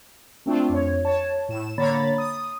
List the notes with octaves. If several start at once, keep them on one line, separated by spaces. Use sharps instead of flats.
A3 C4 D4 F4
F2 C#5
C#5 A5
A2 E7
D3 A#3 C#5 A#5 B5 A6
D#6